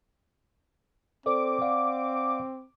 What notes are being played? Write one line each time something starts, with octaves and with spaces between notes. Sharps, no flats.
C4 A4 C5 D5 D6
D5 F5 F#5